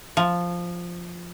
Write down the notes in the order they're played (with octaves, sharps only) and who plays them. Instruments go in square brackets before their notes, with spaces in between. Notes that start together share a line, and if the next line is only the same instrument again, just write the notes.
[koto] F3